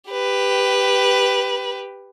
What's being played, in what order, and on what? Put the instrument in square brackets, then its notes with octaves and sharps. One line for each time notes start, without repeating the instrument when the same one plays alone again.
[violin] G4 B4